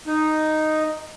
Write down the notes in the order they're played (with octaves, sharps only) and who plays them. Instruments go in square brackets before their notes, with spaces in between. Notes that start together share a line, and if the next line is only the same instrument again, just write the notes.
[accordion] D#4